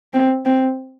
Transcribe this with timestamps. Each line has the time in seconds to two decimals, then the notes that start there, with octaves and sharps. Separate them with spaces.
0.13 C4
0.45 C4